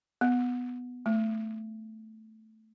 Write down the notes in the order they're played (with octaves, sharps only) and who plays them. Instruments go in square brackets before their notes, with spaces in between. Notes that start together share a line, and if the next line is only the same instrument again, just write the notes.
[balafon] B3
A3